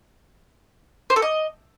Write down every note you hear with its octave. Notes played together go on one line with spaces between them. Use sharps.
C5
A4
D#5